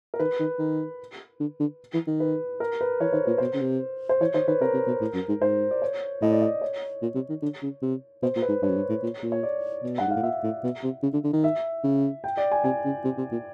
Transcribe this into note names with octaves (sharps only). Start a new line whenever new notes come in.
A#4
D#3 B4
D#3
D#3
D3
D3
E3
D#3
B4
A#4
B4
E3 C#5
D#3 C5
A#2 B4
B2 C5
C#3
C3
C5
E3 C#5
D#3 C5
D#3 B4
C3 A#4
C3
B2
A2
F#2
G#2
G#2 C5
D5
C#5
A2 D#5
D5
D#5
C#5
A#2
C3
D#3
D3
C#3
C3
B2 C5
A#2
B4
G#2
G2 C#5
F#2
G2
A2
A#2
A#2
C#5
D5
B2
G2 F#5
G#2
F5
A2
A#2 E5
A2
B2
C3
C#3
D3
D3
D#3
E5
C#3
G5
D5
G#5
C3 G#5
C#3
C3
C3
A#2